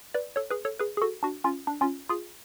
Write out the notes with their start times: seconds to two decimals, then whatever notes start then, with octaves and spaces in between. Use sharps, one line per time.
0.14 B4 D5
0.36 A4 C#5
0.50 G#4 B4
0.65 A4 C#5
0.79 G#4 B4
0.97 G#4
1.02 F#4 A4
1.23 D4 F#4
1.44 C#4 F4
1.67 D4
1.81 C#4 F4
2.09 F4 G#4